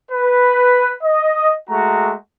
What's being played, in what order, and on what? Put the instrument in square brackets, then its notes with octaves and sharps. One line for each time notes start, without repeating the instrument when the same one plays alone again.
[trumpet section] B4
D#5
G#3 A3 F#4 A#5